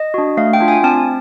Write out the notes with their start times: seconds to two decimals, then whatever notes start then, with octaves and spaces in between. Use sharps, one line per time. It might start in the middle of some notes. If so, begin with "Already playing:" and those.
Already playing: D#5
0.14 D4 F#4
0.37 A3 F5
0.53 G5
0.61 D4 F4
0.68 G#5
0.84 C4 A5